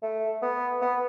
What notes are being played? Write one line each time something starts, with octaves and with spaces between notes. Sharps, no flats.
A3
B3
B3